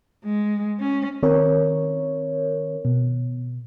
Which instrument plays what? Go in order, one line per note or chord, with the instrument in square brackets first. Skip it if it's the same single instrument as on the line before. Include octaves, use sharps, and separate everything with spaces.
[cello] G#3
C#4
[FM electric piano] D#3 C4 A#4 C#5
B2